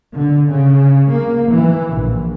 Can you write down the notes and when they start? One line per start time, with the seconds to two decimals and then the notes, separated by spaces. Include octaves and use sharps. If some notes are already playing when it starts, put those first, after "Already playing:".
0.14 D3
0.49 C#3
1.11 A#3
1.51 E3
1.94 A#1